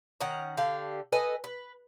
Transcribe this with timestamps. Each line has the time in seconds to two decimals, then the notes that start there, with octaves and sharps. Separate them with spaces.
0.21 D#3 C#4 F#5 A#5
0.57 D3 G4 F5
1.12 A4 B4 D#5 G#5
1.44 B4